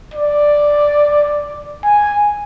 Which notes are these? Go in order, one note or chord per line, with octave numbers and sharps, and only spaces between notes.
D5
G#5